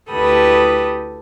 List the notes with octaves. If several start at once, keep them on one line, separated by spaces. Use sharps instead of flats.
D2 E4 G4 A4 B4 D#6